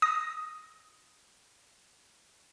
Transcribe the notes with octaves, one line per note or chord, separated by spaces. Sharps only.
D#6 A#6